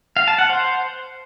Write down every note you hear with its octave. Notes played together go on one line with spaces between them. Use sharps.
F5
A5
F#5
C5